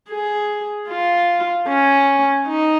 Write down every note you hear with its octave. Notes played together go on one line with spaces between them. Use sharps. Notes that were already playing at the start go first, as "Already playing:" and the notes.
G#4
F4
C#4
D#4